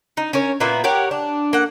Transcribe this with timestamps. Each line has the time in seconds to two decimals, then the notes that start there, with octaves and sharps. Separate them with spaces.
0.17 D#4
0.33 C#4 A#4 C#5
0.60 A#2 A#3 B3 E4
0.84 G4 A#4 C#5 F#5
1.11 D4
1.53 A#3 F#5